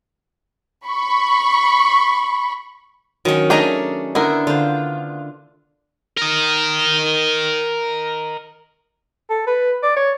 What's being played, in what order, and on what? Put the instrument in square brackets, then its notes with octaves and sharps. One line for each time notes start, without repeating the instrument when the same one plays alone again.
[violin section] B5 C#6
[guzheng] D#3 C#4 [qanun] F#3
[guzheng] A3 D#5 A#5 [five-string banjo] D4 D#4 G#4
[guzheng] D3 [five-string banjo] B3 A#4 [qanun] E4
[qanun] D3 C5 [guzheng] F4
[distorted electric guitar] A#4 D#5
[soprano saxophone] A4
B4
D5
C#5